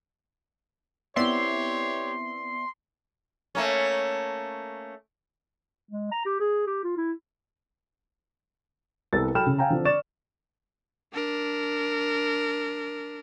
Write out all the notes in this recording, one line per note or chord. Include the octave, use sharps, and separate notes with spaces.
B3 C4 E4 G4 C#5 D5 E5 C6
A3 A#3 C#4
G#3
A#5
G4
G#4
G4
F4
E4
C2 B3 A4 B4 E6 A6
F#3 A4 G5 B5 F6 E7
C#3
F5 G5 G#5 A#5
D3 F3 C4 D4
D5 C#6 A6 E7
D4 A#4